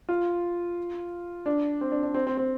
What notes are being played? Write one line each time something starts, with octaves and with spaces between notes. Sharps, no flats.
F4
D4
C4
D4
D4
C4
C4
C4